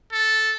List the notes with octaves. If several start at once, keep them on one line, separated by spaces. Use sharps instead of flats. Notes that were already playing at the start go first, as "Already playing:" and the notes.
A4